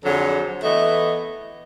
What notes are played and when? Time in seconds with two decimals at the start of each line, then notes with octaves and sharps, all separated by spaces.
0.04 F2 D3 F#3 G#4
0.63 E3 A3 B3 D#5